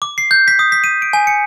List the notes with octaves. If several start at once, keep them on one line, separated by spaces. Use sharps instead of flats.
D6
C7
G6
B6
D#6
B6
D#7
D7
G#5
C#7